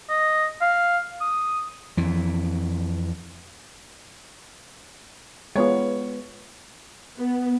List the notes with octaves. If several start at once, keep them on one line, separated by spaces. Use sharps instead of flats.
D#5
F5
D#6
F2 E3
G#3 B3 F4 C#5
B3